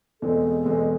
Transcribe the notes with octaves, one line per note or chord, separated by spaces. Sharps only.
E2 B2 G#3 C4 A4
E2 B2 G#3 C4